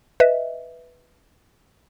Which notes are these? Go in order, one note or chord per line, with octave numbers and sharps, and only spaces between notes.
B4 D#5 E5